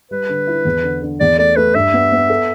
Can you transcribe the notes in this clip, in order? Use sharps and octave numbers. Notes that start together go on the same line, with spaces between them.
G3 B4
D3
E4
E2
D3
D3
E2 D5
A3 D5
A3 B4
G2 E5
B3
B3
A4